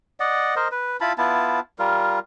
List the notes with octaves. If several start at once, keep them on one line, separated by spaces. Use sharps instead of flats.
D5 D#5 F#5
A#4 C5 D#5
B4
E4 F4 A5 B5
B3 E4 F4 A5
G3 F4 A#4